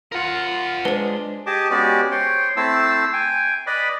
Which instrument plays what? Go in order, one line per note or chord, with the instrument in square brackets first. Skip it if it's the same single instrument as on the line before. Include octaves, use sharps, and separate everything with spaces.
[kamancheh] F4 [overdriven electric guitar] A#4 F#5
[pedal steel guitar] G#3 D4 [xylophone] B4 C5
[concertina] G4 G#4 D#5 A5 D6
G#3 B3 C#4 F#4 G4 D5
C5 C#5 G5 C6
A3 C4 E4 C5 A5 E6
G5 G#5
B4 D5 D#5 B5